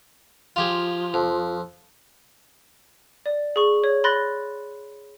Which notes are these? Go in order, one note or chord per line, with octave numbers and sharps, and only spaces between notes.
F3 F4 G4 G#4
F2
D5
G#4 C#6
C#5
B5 C6 F#6 A6 A#6